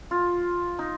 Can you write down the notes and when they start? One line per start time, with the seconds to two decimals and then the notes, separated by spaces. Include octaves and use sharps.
0.11 F4
0.79 D#4